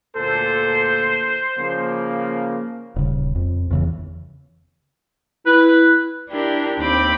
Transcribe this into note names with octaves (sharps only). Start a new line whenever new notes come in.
D2 A#2 A4 C5
C#3 F3 A#3
D#1 C#3
F2
E2 C#3 E3
E4 B4
D4 E4 G4 A#4
D#2 C4 G5 B5 D6